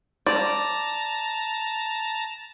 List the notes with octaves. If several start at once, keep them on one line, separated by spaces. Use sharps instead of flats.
D5 A5 A#5